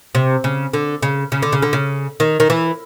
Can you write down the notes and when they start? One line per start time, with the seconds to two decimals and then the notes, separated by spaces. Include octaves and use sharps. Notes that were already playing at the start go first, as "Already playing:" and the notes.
0.15 C3
0.44 C#3
0.73 D3
1.02 C#3
1.32 C#3
1.42 D3
1.52 C#3
1.62 D3
1.73 C#3
2.20 D#3
2.40 D#3
2.50 E3